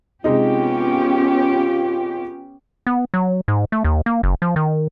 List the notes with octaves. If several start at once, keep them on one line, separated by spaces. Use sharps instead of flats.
C3 G#3 B3 C#4 D#4 F4 G4
B3
F#3
G#2
A3
D#2
A#3
F#1
F3
D#3